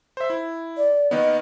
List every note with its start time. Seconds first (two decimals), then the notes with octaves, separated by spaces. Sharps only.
0.17 C5 E5
0.30 E4
0.77 D5
1.11 D#3 A#3 B3 D#5